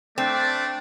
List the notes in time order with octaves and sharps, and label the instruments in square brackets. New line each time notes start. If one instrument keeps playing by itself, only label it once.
[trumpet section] A3 D4 D5 [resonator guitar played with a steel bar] C4